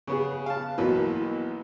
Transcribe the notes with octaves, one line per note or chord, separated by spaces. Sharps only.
C#3 B3 G#4
F5 A5
B1 B2 E3 A#3 B4